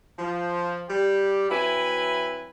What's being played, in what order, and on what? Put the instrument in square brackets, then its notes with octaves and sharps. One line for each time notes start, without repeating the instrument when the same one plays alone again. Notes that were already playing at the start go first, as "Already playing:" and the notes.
[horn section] F3
G3 G4
F#3 C4 E4 B4 E5 G#5